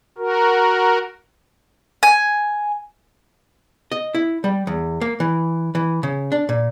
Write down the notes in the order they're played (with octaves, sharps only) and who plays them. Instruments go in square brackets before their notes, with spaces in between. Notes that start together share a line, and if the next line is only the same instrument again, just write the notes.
[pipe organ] F#4 A#4
[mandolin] G#5
[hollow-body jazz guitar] D#5
E4
G3
E2
A#3
E3
E3
C#3
D4
A#2